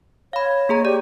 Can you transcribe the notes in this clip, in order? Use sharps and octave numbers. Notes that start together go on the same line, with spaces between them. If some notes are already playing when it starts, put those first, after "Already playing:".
C#5 F5 B5
A#3 G#4 A#5
G4 D5